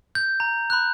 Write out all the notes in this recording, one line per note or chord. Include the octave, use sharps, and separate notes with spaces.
G6
A#5
B5 F#6